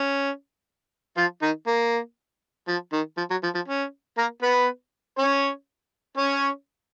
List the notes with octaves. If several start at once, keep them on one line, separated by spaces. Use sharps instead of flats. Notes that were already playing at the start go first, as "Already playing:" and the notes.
Already playing: C#4
F3 F4
D#3 D#4
A#3
F3
D#3
F3
F#3
F3
F3
C#4
A#3 A#4
B3 B4
C#4 C#5
C#4 C#5